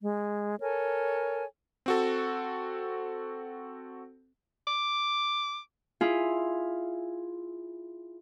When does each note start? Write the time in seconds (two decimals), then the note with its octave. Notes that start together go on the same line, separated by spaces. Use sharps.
0.02 G#3
0.60 A4 A#4 C#5 G#5
1.86 C4 F#4 A4
4.67 D6
6.01 E4 F4 G#4